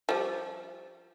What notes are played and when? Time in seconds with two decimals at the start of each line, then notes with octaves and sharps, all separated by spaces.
0.09 F3 G3